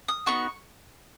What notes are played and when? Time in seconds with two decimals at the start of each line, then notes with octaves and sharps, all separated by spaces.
0.08 D#6
0.26 B3 D#4 F#4 C#6